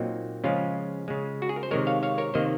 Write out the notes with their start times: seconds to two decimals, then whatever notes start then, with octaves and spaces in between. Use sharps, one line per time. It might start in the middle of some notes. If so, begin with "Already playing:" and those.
Already playing: A#2 F#3 A#3 C4 D#4
0.44 C#3 F3 G#3 C#4 F4
1.08 C#3 G#3
1.42 F#4
1.49 G#4
1.56 A#4
1.63 C5
1.71 C3 D#3 G#3 A#4 C#5
1.87 C#5 F5
2.03 C#5 F5
2.18 A#4 C#5
2.34 C3 D#3 A#3 C5 D#5